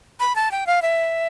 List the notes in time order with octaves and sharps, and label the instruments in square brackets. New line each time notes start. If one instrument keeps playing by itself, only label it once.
[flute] B5
A5
G5
F5
E5